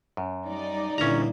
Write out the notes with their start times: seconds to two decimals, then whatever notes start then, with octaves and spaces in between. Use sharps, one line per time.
0.17 F#2
0.47 G3 D#4 D5
0.98 D#2 A#2 D3 E3 C#4 A#5